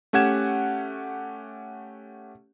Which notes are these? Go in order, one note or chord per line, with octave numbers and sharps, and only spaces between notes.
A3 C#4 G4 F#5 G#6 E7